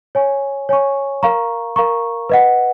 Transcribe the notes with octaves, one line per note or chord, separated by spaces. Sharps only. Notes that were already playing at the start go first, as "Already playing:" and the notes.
C#5 G#5 C#6
C#5 G#5 C#6
A#4 F5 A#5 C#6
A#4 F5 A#5 C#6
B4 D#5 F#5